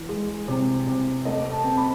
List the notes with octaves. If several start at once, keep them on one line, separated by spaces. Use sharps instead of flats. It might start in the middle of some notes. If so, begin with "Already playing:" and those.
Already playing: E3
G#3
C3
C3
A3 D#5
A5
C4
B5